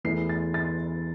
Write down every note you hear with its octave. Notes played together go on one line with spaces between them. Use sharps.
E2 E3 A3 E4 C7
A6
A6